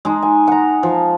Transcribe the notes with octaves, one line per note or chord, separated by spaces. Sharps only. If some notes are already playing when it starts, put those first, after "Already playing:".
G#3 D#4
G#5
F#5 A#5
F3